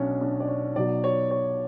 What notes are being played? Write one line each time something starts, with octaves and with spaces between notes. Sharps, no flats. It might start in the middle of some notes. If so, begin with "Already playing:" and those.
Already playing: B1 B2 C#4 D4
D4
D5
C#5
B1 B2 F#3 D5
C#5
C#5